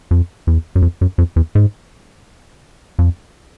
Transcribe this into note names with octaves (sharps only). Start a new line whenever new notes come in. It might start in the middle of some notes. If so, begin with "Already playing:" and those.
F2
E2
F#2
F2
F#2
F2
E2
G#2
F2